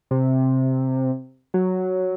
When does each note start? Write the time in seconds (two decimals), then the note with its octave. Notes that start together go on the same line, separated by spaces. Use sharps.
0.11 C3
1.54 F#3